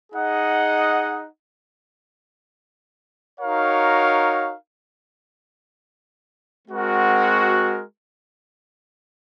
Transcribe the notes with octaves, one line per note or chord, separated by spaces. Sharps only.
D#4 G#4 D#5 F#5
D#4 F#4 A#4 C#5 F5
G#3 C4 F#4 A#4